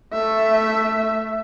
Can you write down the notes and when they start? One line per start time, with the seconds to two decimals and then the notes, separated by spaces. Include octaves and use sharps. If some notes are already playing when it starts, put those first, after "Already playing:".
0.13 A3 E5